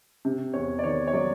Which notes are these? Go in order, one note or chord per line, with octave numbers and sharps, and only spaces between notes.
C3
E2 C#5
D5
D#3 C#5
C#5
F#3 D5